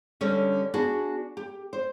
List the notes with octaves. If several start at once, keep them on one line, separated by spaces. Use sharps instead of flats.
D3 G3 C#4 C#5
B3 D4 F#4 G#4
G4
C5